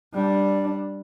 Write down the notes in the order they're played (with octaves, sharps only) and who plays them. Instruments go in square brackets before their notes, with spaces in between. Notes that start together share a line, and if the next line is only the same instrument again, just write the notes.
[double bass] G3 D4